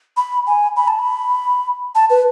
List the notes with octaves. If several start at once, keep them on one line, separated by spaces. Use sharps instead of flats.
B5
G#5
B5
A5
B5
A5
B4